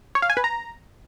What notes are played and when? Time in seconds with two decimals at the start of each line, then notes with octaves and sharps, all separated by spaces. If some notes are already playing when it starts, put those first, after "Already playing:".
0.15 C#5
0.22 F5
0.30 G#5
0.37 B4
0.44 A#5